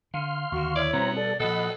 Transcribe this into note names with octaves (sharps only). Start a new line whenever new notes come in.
D3 F5 C6
D#2 D3 F#4 C#6
E4 C#5 D5
B2 G3 B3 C4 A#5
A4 D5
A#2 F3 A4 D#5 F#5 B5